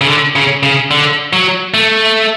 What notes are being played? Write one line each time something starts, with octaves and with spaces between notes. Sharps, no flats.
C#3
D3
C#3
C#3
D3
F#3
A3